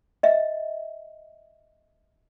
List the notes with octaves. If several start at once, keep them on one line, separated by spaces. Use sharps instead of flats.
D#5 E5